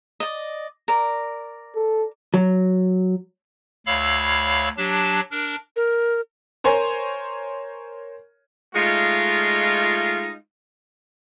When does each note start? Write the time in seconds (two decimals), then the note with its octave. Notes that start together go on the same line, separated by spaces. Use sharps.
0.20 D5 D#5
0.88 A#4 D5
1.75 A4
2.34 F#3
3.86 D2 C#5 F5 B5 E6
4.77 F#3 D4 G4 A5
5.31 D4 A#4
5.76 A#4
6.64 A#4 C5 C#5 G#5
8.74 G#3 A3 D#4 F4